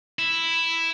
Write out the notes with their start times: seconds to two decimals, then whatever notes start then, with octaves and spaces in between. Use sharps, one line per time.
0.19 E4